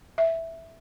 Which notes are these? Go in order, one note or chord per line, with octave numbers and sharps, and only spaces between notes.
E5